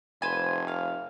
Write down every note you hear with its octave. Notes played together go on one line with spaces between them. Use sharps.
F1 B4 C5 G#5
F5